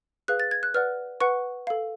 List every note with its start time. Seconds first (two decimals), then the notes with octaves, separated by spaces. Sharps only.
0.28 G#4 B4 F5 F#6
0.40 A6
0.51 G#6
0.63 F#6
0.74 B4 D5 F#5 F6
1.20 B4 F#5 C#6
1.67 A4 F5